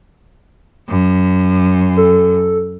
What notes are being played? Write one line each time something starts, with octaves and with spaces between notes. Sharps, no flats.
F#2
A4